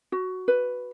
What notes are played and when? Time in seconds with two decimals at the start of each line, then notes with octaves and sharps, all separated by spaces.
0.12 F#4
0.48 B4